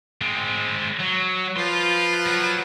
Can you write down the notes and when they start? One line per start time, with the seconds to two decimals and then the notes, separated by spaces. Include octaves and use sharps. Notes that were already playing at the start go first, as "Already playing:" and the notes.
0.21 G#3 C4
0.99 F#3
1.57 F3 B4 F5 C6
2.26 F#3